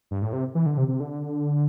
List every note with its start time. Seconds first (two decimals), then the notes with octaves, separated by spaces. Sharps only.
0.11 G2
0.22 A2
0.33 C3
0.55 E3
0.66 D3
0.77 C3
0.88 C3
1.00 D3